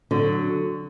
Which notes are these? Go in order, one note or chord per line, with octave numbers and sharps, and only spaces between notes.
D3 F#3